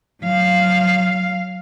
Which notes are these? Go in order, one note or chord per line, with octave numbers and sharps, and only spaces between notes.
F#3 F5